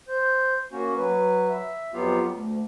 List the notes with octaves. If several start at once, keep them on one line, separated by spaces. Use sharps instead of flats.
C5
A#3 C#4 F#4
F#3 B4
E5
F2 F#3 B3 F4 G4 F5
D2